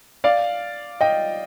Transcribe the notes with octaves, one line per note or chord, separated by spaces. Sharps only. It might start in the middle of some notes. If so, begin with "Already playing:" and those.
D5 F5
D#5 G5